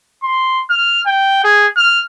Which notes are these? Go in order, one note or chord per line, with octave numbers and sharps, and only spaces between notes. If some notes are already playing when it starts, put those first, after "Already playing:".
C6
F6
G5
G#4
F6